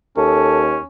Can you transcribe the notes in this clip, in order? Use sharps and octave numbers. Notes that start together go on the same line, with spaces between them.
D#2 C#4 A4